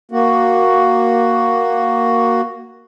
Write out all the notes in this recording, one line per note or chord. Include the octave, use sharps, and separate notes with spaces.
A#3 F#4